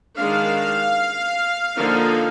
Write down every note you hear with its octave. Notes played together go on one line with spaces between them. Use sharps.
D#3 G#3 D4 F5
D3 F3 A#3 D#4